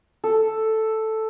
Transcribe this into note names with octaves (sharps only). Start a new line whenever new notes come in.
A4